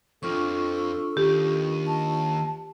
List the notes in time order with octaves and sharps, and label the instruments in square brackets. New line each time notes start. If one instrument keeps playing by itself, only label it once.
[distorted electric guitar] F2 [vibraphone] D4 F4 C#6 [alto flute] A4
[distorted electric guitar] D#2 [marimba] G4
[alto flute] A5